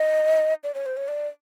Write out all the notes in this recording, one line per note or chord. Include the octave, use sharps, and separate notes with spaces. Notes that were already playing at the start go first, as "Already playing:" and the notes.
Already playing: D#5
D5
C#5
C5
C#5
D5